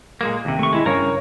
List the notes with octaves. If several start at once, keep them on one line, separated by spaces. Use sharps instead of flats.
A#2 G#3 A#3
D#2 C3
A3 C#6
G#3 E4
G2 C#3 A#4 C#5